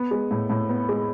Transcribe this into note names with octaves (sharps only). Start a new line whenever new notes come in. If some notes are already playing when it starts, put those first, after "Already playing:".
Already playing: B3
G#3
A2
A2
B3
G#3